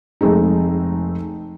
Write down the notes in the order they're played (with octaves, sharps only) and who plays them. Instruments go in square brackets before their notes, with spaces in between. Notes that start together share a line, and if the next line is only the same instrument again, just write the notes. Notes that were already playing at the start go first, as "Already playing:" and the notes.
[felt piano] F1 G#3 A3 C4 D#4